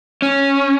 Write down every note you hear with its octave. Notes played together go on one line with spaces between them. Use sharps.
C#4